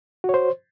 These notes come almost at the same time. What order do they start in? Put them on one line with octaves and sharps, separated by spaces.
F#4 C#5 C5